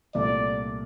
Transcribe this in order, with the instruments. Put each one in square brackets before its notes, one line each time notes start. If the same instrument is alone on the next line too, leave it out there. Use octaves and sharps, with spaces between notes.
[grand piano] C2 A#2 A3 [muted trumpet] D5